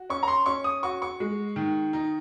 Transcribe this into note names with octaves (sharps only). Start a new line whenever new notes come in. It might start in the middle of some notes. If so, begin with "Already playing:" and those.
Already playing: F#4
C#4 C#6
A#5
C6
C#4 C#6
D#6
F#4 C#6
C#6
G#3
D#3
D#4